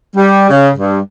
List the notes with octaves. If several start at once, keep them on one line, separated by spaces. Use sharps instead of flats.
G3
C#3
G2